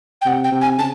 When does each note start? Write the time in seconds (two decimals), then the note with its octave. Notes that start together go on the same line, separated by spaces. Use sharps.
0.21 G5
0.26 C3 F#5
0.44 G5
0.52 C3
0.61 G#5
0.78 C#3 A5